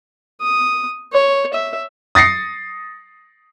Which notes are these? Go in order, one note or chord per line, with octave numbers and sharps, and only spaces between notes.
D#6
C#5
E5
D#6 A6 A#6 C7 C#7